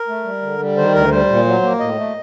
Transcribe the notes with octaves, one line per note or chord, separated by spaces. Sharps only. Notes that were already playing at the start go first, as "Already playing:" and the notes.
Already playing: A#4
A3
G3
D3
G3
D#3 C5
D2 A#4
G3 C5
A#2
F#3
A#3
A2 D#5
A3